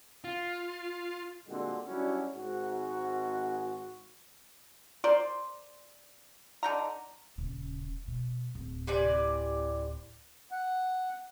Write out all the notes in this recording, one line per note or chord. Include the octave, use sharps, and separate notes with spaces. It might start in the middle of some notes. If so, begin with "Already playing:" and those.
F4
A#2 D3 G3 G#3 C4 F#4
F#3 G3 C#4 D4 E4 F#4
G#1 G#2 F#4
A#4 C5 D5 C6
D3 D#4 A#5
D#1 C#3
B2
D1
C3 E3 D5
F#5